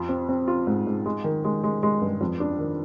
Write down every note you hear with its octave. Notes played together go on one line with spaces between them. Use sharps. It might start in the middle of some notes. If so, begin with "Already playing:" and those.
Already playing: F2 F4
C4
C4
F4
G#2
G#2
G#3
D#3
G#3
G#3
G#3
G2
F2
D4
D#3